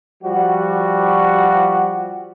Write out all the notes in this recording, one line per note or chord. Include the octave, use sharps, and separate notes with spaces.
F3 G3 F#4